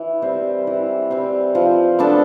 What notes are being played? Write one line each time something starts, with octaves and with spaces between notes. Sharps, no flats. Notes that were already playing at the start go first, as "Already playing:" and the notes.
Already playing: E3
G3 C4
E3
G3 C4
F3
B3 D4 A4